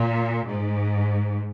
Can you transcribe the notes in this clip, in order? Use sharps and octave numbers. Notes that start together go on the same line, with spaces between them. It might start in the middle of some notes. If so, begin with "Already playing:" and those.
Already playing: A#2
G#2